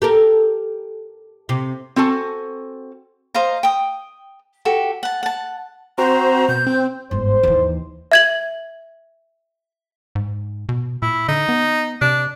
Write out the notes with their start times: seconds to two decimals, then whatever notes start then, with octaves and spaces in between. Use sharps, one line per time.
0.02 G4 A4 A#4
1.49 C3
1.96 C4 F#4 A4 G#5
3.34 C5 D#5 F5 A#5
3.63 G5 D#6
4.65 F#4 G4 A4
5.03 F#5 A5
5.23 F#5 A5
5.98 C4 F#4 C5 A#5
6.48 B2 G6
6.67 C4
7.11 G1 G#2 C5
7.43 D#2 E3
8.12 E5 G#6 F#7
10.15 G#2
10.69 B2
11.02 A#2 E4
11.29 D3 D#4
11.49 B3
12.02 C3 D4